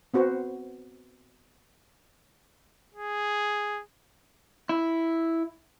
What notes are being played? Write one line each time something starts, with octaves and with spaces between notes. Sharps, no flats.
B3 C4 F#4 C5
G#4
E4